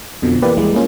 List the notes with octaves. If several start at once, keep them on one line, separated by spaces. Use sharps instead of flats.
F2 B2 D3 F3
E3 A#3 G4 B4 D5
D#2 E3 G3 G#3
E3 A#3 C#4 F4